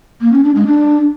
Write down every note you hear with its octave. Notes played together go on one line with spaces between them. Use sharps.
A#3
C#4
D4
G#3
D4